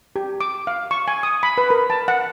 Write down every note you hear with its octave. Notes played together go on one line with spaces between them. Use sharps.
G4
D6
F5
C#6
G#5
D#6
B5
B4
A#4
A5
F#5